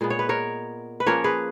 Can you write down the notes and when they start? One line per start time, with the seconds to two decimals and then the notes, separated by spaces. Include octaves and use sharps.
0.01 A#2 G#3 B3
0.10 C#5
0.19 B4
0.29 A#4 C#5
1.00 B4
1.07 F3 A#3 C#4 A#4 C#5
1.24 G#4 B4